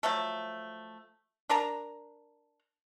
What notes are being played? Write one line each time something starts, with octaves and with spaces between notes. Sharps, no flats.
F3 F#3 A3 A4
D4 A#4 A5 A#5